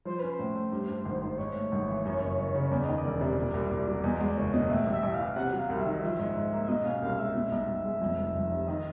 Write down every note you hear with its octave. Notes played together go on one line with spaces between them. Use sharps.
F3 C5
C#4 B4
C5
A2
A3
G2
G3
G#1
D#3
G#2 C#5
A3
G#1
E3
F#2
F#1
F#1
C#3
E2 D5
D#3 D#5
D5
E1
C3
A#2
C2
C2
F#3
E2 D#5
G#3 D5
F#1 C#5
B2 D#5
A2 E5
A1
E5
A1
E3 F5
C3 F#5
F#3
F5
C2
E5
D#3 D#5
F3 E5
G#2
G#2
A#3
E5
B2 D#5
C#4 F5
C2 F5
G#3 E5
B2
B1
B1
G#3
F2
F1
F1
C3
D#3 D#5